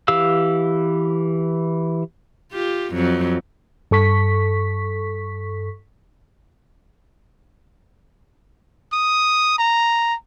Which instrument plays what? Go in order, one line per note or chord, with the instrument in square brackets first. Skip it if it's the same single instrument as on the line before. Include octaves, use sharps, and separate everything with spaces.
[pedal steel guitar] E3 G4 F5 E6
[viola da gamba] F4 G4
F2 F#3
[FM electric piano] G2 A4 C#6 B6
[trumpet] D#6
A#5